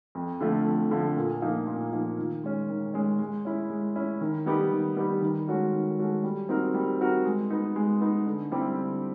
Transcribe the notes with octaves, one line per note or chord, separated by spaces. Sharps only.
F2
D3 F3 A3
F2
D3 F3 A3
A#2
F3 A#3 D#4
A#2
F3 A#3 D#4
D#3
G#3 C#4
D#3
G#3 C#4
G#3
C#4 E4
G#3
C#4 E4
D#3
G3 B3 D#4 G4
D#3
G3 B3 D#4 G4
D#3
G#3 C#4 F#4 A4
D#3
G#3 C#4 F#4 A4
G3
C4 D#4 F#4 A#4
G3
C4 D#4 F#4 A#4
G#3
B3 D#4
G#3
B3 D#4
D3
G3 C4 E4 G4
D3